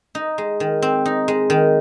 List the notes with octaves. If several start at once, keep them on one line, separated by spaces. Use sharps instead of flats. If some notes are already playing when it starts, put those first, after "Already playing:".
D#4
G#3
D#3
C4
D#4
G#3
D#3